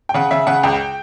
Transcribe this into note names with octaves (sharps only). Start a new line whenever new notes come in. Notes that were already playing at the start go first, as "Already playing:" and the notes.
G5
C#3 F#5
C#3 E5
C#3 F#5
C#2 G5